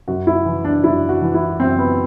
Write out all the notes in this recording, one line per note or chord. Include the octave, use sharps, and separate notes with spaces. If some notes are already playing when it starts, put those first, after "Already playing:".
F#2 F#4
E4
E3
D4
F#2 E4
F#4
E3
E4
F#2 C4
B3